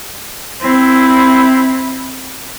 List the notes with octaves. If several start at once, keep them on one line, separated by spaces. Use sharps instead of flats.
C4 E4